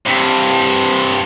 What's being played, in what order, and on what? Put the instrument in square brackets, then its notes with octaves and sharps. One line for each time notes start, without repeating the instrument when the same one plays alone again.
[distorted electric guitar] G2 C3